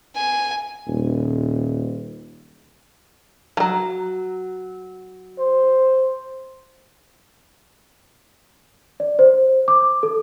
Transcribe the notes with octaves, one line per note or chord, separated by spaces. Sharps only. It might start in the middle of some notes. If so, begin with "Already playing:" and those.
G#5
D#1
F3 F#3
C5
D5
C5
D6
A4